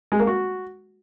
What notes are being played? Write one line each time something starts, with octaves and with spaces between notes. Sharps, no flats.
G#3
A#3
F#4